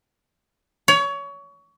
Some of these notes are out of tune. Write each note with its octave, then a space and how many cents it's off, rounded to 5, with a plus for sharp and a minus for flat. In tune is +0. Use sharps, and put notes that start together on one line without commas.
C#5 +25